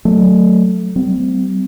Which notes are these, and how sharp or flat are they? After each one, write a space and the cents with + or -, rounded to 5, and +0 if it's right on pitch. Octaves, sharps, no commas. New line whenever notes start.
F#3 +0 A3 +0
G3 -35 C4 -35